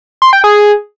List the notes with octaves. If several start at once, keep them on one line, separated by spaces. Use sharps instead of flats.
C6
G5
G#4